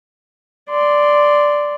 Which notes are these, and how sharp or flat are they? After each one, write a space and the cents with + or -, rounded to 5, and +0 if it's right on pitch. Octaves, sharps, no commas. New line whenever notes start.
D5 +0 C6 -10